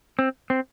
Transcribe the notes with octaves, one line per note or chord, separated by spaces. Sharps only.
C4
C4